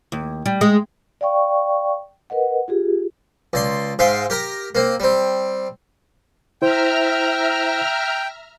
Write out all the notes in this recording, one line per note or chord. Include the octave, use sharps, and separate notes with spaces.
D#2
G3
G#3
D5 F5 G5 C#6
A#4 B4 D#5 F#5
F4 G4 G#4
C#2 D5 C6
G#2 E5 F5 G5 C6
G4 A#4 A#5
A#3 C4
G3 C4
E4 C5 E5 G5 A#5 F6